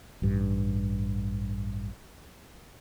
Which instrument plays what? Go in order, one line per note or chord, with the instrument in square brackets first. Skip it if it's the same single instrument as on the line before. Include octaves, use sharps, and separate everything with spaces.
[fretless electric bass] A1 G2